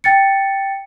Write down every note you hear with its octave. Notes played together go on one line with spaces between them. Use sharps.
G5 A6 C#7